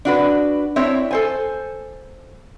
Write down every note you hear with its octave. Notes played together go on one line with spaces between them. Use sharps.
D4 F#4 B4
C4 D4 E4 C#5 E5
A4 C5 G#5